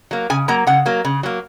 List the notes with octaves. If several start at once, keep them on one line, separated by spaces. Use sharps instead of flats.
F#3 A#3
C#3 G#5
F#3 A#3 A#5
C#3 F#5
F#3 A#3
C#3
F#3 A#3